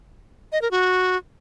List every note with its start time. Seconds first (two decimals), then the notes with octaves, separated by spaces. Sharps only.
0.52 D#5
0.62 A#4
0.71 F#4